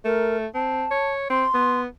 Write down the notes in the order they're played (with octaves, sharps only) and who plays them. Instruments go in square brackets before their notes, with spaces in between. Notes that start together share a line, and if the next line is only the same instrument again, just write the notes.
[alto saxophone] A3 [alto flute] A#4
[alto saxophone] C4 [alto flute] A5
[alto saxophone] C#5
[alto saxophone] C4 [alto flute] C6
[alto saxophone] B3